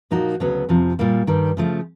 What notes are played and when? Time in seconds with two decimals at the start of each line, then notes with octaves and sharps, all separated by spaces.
0.11 A#2 F3 A#3 D#4 F#4
0.40 D2 C#3 F#3 B3
0.69 F2 C3 F3
0.99 A#2 G3 A#3
1.27 G2 D#3 G3
1.57 C#3 F3 A3